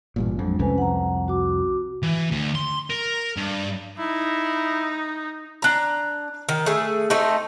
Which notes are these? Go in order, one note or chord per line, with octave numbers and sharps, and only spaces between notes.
A1 G2 A#2
F2 F#3 G#3 D4
C2 F2 C3 C#4 B4 G#5
F#5 A#5
F#4 D6
E3
D2
C6
A#4
G2
D#4 E4
D4 A#5
D#3
A3 G#4
A3 C4 D#4